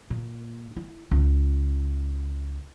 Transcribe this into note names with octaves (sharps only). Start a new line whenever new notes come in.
A#2
E4
C#2